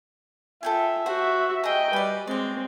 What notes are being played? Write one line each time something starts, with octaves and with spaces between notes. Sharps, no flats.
F4 A4 E5 G5 G#5
F#4 C5 F#5
G#4 D#5 G5 A#5
G3 B4 D5 G#5
G#3 C4 C#5 D5